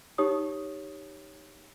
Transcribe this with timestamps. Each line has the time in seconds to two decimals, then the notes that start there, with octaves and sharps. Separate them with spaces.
0.18 D#4 G4 C#5 D#6